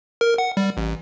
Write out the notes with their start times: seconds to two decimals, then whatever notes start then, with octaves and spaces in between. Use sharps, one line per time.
0.21 A#4
0.38 F#5
0.57 G3
0.77 A1